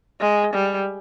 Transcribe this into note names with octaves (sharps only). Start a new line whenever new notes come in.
G#3
G3